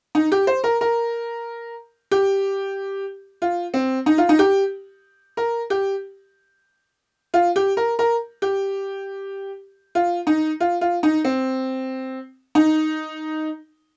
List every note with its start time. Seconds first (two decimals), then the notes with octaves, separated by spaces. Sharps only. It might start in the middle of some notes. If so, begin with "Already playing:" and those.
0.15 D#4
0.32 G4
0.47 C5
0.64 A#4
0.81 A#4
2.11 G4
3.42 F4
3.74 C4
4.06 D#4
4.18 F4
4.29 D#4
4.39 G4
5.37 A#4
5.70 G4
7.34 F4
7.56 G4
7.77 A#4
7.99 A#4
8.42 G4
9.95 F4
10.27 D#4
10.60 F4
10.81 F4
11.03 D#4
11.25 C4
12.55 D#4